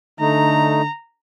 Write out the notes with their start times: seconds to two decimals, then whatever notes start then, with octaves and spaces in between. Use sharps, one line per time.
0.20 D3 A3 D#4 A#5